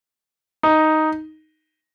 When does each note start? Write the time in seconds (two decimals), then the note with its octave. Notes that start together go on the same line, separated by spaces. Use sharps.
0.63 D#4